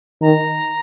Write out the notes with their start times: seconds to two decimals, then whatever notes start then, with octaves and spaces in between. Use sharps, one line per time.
0.22 D#3 A#5